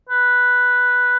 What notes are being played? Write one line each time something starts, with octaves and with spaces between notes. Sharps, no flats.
B4